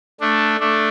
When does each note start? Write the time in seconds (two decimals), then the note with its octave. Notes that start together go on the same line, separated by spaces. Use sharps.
0.21 A3 D4
0.60 A3 D4